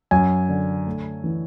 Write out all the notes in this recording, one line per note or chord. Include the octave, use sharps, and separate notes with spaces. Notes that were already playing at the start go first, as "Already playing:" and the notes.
F#2 G#5
D3
A3
E3